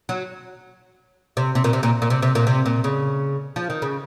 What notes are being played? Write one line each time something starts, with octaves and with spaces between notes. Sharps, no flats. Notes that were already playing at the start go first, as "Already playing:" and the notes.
F#3
C3
C3
A#2
C3
A#2
A#2
C3
C3
A#2
C3
A#2
C#3
F3
D#3
C#3